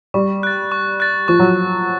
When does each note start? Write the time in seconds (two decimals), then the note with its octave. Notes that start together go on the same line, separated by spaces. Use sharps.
0.14 G3 C#6
0.43 F#6 A6
0.72 C#6
1.00 F#6 A6
1.28 F3 C#6
1.39 F#3